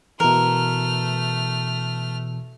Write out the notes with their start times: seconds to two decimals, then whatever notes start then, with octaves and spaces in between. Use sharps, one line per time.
0.20 B2 E3 A3 A#4 F6